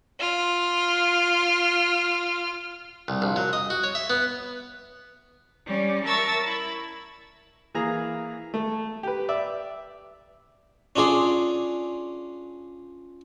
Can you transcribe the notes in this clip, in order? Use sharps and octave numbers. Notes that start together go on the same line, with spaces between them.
F4 F6
C2
A#1
F#3
D#5
F#4
C#5
E5
B3
G3 C#4 D5
A#4 E5 A5 C#6 E6 A6
E4
E3 A#3 G#4 A#5
A3
G4 B4
D5 E5
C#4 D4 F4 G#4 D5